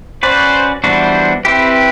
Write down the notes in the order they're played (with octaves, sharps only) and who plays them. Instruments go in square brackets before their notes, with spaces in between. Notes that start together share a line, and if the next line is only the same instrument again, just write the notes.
[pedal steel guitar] C#4 F#4 B4 D5 [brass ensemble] C5
[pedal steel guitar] E3 G3 B3 D4 F#4 [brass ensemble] C5
[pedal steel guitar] C4 E4 G4 [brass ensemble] B4